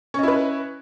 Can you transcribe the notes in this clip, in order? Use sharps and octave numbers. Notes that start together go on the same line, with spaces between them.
C#4 E4 B4 D#5